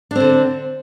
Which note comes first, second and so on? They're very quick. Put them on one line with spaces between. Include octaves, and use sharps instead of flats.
D4 C4 D3